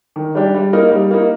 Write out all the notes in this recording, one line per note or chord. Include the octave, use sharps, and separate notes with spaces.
D#3
G3 D4 G4
G3
A#3 D#4 A#4
G3
A#3 D#4